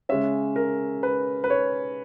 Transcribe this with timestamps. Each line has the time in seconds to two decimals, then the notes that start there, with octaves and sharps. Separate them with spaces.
0.09 C#3 G#3 C#4 E5
0.56 A#4
1.03 B4
1.44 B4
1.50 C#5